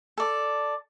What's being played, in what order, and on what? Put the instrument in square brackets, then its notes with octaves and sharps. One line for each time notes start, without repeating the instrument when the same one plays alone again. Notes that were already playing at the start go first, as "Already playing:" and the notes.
[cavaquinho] A4 D5